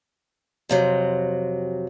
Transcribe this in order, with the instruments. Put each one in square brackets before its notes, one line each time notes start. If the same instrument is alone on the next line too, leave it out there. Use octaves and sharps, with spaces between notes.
[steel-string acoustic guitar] F2 C3 F#3